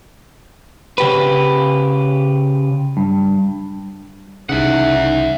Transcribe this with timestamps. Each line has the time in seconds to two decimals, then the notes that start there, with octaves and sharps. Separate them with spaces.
0.98 C#3 G4 B4
2.97 G2
4.49 C2 C#3 D#4 E5 F#5